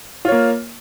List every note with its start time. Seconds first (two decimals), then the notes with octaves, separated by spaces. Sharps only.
0.25 F4
0.28 C#5
0.32 A#3